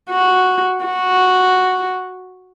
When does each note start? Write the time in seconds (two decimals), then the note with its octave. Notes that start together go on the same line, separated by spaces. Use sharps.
0.10 F#4
0.85 F#4